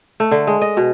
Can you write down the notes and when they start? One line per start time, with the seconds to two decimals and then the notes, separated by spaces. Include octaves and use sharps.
0.20 A3
0.31 D3
0.47 G#3
0.61 D#5
0.77 B2